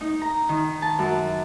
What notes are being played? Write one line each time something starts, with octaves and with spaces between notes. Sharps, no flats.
D#4
A#5
D#3
A5
F#2